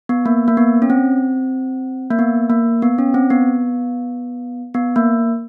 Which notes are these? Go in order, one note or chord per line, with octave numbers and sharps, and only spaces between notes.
B3
A#3
A#3
B3
C#4
C4
A#3
B3
A#3
B3
C#4
C4
B3
B3
A#3